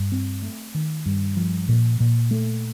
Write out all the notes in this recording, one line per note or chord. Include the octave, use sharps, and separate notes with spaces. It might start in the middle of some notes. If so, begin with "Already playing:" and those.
Already playing: G2
C4
A3
D#3
G2
F3
A#2
A#2
A3